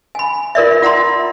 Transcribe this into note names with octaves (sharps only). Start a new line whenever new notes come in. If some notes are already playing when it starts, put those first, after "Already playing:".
G#5 B5
F4 A#4 D5 E5
F4 F#5 A#5 C6